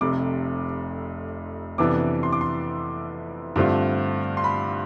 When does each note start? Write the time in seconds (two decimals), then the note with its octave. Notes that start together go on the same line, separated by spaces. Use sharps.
0.01 F1 F2 C3 D6
1.78 F2 C3 E3 B3 D4 D6
2.23 C6
2.33 D6
2.41 C6
3.56 G2 D3 A3 C4 F4
4.37 C6
4.44 B5